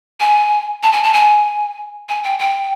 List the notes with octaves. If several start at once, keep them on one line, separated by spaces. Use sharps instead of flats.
G#5
A5
G#5
A5
G#5
G#5
G5
G5